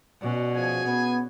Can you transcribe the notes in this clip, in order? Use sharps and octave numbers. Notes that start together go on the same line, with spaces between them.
B2 C#4 F#4 D5
F3 G#4 G#5
B3